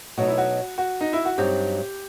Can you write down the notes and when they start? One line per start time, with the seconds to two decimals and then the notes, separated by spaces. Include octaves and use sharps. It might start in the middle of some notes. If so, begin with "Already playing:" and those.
0.18 B2 F#3 A3 D#4 F#4
0.27 E4
0.38 F#4
0.78 F#4
1.01 D#4
1.13 E4
1.25 F#4
1.38 G2 F#3 C4 D#4 F#4 G4